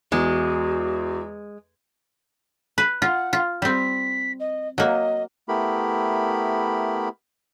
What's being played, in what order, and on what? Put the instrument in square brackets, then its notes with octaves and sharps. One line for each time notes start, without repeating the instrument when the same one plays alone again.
[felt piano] E2 [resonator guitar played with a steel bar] G#3 [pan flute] F#4
[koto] B4
[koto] F4 [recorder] F#5
[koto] F4
[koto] G3 C4 [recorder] B6
[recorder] D#5
[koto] F#3 A#3 [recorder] D#5
[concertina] A3 B3 E4 G4 A#4 B5